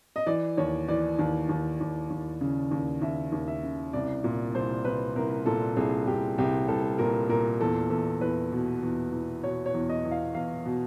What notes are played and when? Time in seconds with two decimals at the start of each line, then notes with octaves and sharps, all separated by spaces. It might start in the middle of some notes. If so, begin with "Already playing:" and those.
0.16 D#5
0.27 E3 D5
0.57 D#2 C#5
0.88 E3 D5
1.19 D#2
1.49 D#2
1.80 D#2
2.10 D#2
2.41 C#3
2.71 D#2
3.01 D#2 E5
3.32 D#2
3.48 E5
3.63 C#3
3.93 C2 D5
4.24 A#2
4.55 C2 C5
4.85 C2 B4
5.16 C2 A#4
5.46 A#2 A4
5.76 C2 G#4
6.07 C2 G4
6.38 C2 G4
6.68 C2 A4
6.98 A#2 A#4
7.29 A#2 A#4
7.61 E2 A4
7.90 E2 A4
8.21 E2 B4
8.52 B2
8.83 E2
9.12 E2
9.43 B2 C#5
9.66 C#5
9.74 E2
9.89 D#5
10.05 E2
10.11 F5
10.35 E2 F5
10.65 B2